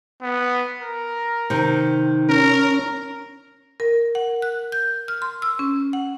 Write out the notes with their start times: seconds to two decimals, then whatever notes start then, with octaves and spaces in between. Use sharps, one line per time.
0.22 B3
0.81 A#4
1.50 C3 D#3
2.29 C#4 A#4
3.80 A#4
4.15 F#5
4.42 F#6
4.72 G6
5.08 F6
5.22 C6
5.42 E6
5.59 C#4
5.93 F#5